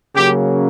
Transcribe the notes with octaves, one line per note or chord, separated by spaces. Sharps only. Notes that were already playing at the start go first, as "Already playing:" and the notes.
C#3 F#3 A#3 C#4 G4